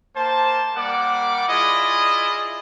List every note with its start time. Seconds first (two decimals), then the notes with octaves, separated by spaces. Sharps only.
0.16 A#3 C5 A5
0.76 G3 A#3 D5 F#5 D6
1.49 E4 F4 G#4 D5 D#5